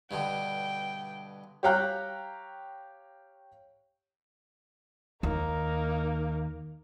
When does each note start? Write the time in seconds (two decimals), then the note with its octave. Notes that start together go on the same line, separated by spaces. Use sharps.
0.11 G2 B2 D3 G5
1.63 G4 C#5 F5 G5 A#5 F#6
5.23 D#2 A#3 D#4